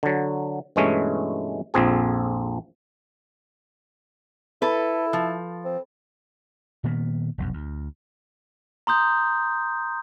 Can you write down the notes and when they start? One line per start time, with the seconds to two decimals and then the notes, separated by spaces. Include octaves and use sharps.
0.03 D3 F#3
0.76 G2 B2 E3 G#3 A3 C#4
1.74 A#1 F2 C4 G#4
4.62 E4 A4 B4
5.13 F3
5.65 C4
6.84 A#2 D#3 A#3 B3
7.38 F1 B1 F#2
7.53 D2
8.87 A#5 C6 D#6 G6